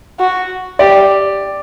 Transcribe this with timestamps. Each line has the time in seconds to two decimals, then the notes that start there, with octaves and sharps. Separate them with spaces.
0.20 F#4
0.79 G4 D5